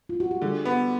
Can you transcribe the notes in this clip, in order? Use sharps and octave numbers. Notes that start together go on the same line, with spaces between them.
F4
F#4
G4
D3 G#4
B3